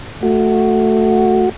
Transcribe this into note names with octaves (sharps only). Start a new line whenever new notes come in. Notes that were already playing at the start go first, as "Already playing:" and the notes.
A3 F#4